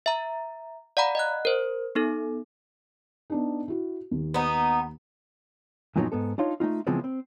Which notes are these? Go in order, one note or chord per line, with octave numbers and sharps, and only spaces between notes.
E5 A#5
D5 F5 F#5 A#5 B5
D#5 F#5 F#6
A#4 C5
B3 D#4 A4
B3 D4 D#4
E4 F#4
D#2
B3 D#4
F#2 A#2 F3 F#3 B3 D#4
G#2 B3 A4
D4 D#4 F4 C#5
A3 C#4 D#4 F4
C#3 E3 F3 G#3 B3 C4
C4